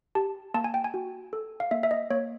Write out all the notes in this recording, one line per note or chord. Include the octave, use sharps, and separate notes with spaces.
G4 A5
A#3 A5
G#5
G5
G#5
F#4
A4
F5
A#3 E5
E5
D#5
A#3 C#5